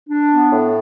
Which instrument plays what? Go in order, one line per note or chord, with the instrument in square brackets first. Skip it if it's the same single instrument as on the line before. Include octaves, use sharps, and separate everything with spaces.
[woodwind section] D4
B3
A2